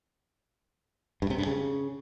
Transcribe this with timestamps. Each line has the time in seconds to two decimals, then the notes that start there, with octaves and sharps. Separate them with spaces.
1.22 G2
1.30 C3
1.38 G2
1.46 C#3